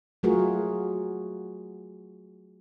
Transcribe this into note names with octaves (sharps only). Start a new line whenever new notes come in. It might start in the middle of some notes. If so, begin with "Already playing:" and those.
F#3 A3 F4 F#4 G#4 A#4